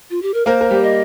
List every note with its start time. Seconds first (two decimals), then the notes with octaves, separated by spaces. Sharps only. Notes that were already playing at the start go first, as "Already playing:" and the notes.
0.10 F4
0.22 G4
0.34 A#4
0.46 A#3 A#4 C5
0.61 A#4
0.71 G3 G4
0.83 D#5